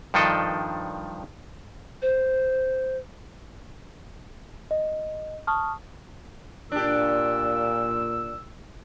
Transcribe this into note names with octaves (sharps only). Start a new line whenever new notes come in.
G2 D#3 F3 D4 A4 D#5
C5
D#5
A5 C#6 D#6 F6
A#2 D4 G4 E6